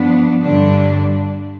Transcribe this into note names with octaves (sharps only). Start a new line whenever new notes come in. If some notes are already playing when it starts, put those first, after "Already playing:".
Already playing: G2 F3 B3 D4
G2 D3 G3 D4